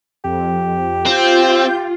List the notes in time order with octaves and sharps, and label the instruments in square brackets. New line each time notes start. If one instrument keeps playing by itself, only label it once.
[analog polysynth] F2 [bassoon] G4
[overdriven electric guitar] C4 [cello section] F4 [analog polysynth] G6